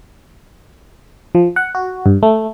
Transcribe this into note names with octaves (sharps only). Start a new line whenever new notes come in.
F3
F#5
F#4
G2
A3